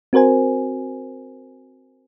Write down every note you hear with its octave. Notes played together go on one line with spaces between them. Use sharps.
C4 F#4 A#4 C5 G#5